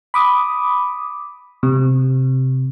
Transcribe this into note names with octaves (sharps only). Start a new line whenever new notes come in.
B5 D6 D#6
C3